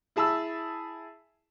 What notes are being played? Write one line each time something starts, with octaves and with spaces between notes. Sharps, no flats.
E4 G#4 A5 B5 E6